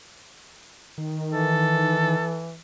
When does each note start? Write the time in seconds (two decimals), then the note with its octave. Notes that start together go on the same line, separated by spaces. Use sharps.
0.98 D#3
1.33 E3 A4